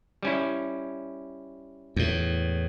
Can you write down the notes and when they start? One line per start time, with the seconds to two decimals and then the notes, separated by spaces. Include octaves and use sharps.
0.23 G3 C#4 E4
1.96 E2 A2